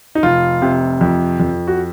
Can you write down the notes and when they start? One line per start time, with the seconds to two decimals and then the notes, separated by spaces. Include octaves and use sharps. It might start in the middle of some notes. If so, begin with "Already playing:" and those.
0.15 D#4
0.23 F1 F4
0.62 C3
1.01 F2
1.40 F2
1.67 F#4